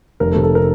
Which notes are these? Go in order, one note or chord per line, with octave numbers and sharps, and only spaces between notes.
F1 A#4
A4
C3
A4
A#4